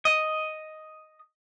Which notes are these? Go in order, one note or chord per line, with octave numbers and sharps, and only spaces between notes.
D#5